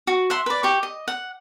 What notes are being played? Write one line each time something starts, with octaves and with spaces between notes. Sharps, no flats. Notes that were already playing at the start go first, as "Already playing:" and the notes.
F#4
E5 F#5 C6
B4 D5
G4 C#6
D#5
F#5